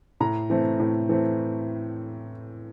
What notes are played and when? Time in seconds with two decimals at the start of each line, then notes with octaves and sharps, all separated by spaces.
0.20 A2 A#5
0.50 E3 A3 C4
0.80 A2
1.09 E3 A3 C4